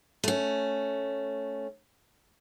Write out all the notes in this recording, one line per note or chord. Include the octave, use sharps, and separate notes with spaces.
A3 C#4